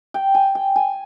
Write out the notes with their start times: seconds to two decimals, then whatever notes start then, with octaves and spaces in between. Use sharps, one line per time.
0.14 G5
0.35 G#5
0.55 G5
0.76 G#5